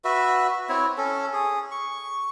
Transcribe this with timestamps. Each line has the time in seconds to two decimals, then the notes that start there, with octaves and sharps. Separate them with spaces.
0.05 F#4 B4 E5
0.69 C4 E4 C#5
0.98 C#4 A4
1.33 G#4
1.71 C#6